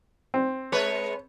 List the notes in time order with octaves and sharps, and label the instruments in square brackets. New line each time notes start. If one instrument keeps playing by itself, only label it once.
[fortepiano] C4
[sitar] G#3 B4 C#5